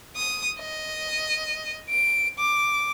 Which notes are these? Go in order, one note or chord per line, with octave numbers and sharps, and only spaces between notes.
D#6
D#5
D7
D6